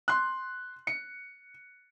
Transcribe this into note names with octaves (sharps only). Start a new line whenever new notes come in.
C6 F#6
C#7